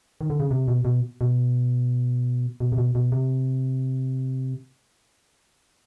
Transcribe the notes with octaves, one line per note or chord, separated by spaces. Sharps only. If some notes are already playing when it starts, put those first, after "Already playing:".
D#3
D3
C#3
C3
B2
B2
B2
B2
C3
B2
B2
C3